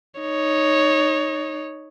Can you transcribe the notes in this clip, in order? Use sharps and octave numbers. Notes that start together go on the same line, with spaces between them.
D#4 C#5